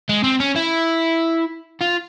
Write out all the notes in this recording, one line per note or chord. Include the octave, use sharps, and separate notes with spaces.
G#3
C4
C#4
E4
F4